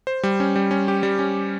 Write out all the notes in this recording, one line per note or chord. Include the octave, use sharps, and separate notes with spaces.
C5
G3
C#4
G3
C#4
G4
G3
C#4